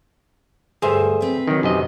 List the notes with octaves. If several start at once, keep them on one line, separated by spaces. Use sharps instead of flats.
D2 G2 G#4 C5 E5
C4 B4
D#3 F#3
F#2 C3 D#5